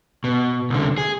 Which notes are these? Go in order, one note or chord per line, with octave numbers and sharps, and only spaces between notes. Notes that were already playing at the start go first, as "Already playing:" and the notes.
B2
C2 D3
G#4